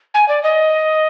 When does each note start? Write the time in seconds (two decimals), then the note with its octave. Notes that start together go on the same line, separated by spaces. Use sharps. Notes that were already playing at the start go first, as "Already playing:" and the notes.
0.14 G#5
0.28 D5
0.43 D#5